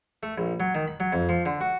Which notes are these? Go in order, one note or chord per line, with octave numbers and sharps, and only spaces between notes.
A3
A#1
F#3
D#3
B5
F#3
F2
F3
D3
F#4